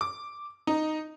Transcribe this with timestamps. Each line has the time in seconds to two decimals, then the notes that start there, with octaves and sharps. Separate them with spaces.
0.01 D6
0.67 D#4